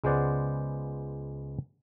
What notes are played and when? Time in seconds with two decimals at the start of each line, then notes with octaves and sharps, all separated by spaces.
0.04 C#2 G#3 B3 C5 D5 F#5